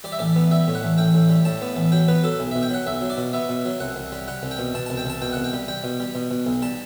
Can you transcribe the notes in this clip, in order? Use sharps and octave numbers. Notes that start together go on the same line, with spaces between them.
G3 D5
E5
A1 D5
B3
G3 E5
A2
F#5
A1
A1 G5
A2
G3
A2 A5
B3
A1
F#3 G5
B3 B4
F#3 A4
B1
B2 E5
G5
F#3 F#5
B1 E5
F#3
D5
B2
B3 E5
B2
F#3
C2 F#5
C2
G3
G3 F#5
C2
G5
B2
B2 A5
C2 A5
G5
C2 A5
B2 G5
C2 F#5
G5
G3
G3 G5
B2
G3
B2
B2
B1
G3 A5